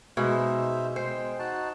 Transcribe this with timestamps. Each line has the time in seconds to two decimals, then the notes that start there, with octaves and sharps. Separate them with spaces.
0.17 B2 G#3 D#4 C5 E5
0.96 G#3 C5 G5
1.39 D#4 F#4 A5